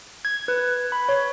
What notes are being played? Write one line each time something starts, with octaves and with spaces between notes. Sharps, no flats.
G#6
B4
B5
C#5